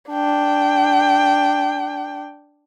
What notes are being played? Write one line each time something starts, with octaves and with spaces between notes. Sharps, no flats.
D4 G5